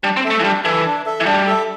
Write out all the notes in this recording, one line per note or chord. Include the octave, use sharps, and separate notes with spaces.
G3 D4
C4
A4 E5
A3
E3
G3 D4
E3 A4 E5
D4
A4 E5
E3
G3 D4
A4 E5